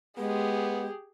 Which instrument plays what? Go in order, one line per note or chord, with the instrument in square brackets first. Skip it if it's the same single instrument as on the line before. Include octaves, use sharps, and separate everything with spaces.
[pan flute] G#3 [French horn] B3 [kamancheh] G4 G#4